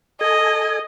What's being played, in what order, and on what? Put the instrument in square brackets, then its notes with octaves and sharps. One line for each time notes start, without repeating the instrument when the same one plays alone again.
[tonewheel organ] A4 G#5 [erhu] D#5